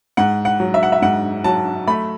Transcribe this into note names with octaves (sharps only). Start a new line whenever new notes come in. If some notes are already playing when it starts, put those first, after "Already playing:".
G#2 F#5
F#5
F#3
E5
F#5
E5
G#2 F#5
F#3 A5
A3 B5